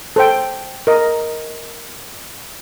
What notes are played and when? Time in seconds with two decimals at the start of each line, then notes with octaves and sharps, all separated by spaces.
0.16 A4 C5 G5
0.87 A#4 D#5